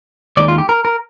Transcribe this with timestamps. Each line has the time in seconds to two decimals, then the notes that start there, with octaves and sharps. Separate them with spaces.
0.37 D#2 D#3 G#3 D#4 D5
0.48 F4
0.58 G4
0.69 A#4
0.85 A#4